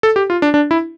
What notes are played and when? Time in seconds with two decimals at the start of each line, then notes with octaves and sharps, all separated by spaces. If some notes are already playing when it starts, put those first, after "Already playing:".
0.03 A4
0.16 G4
0.30 F4
0.42 D4
0.54 D4
0.71 E4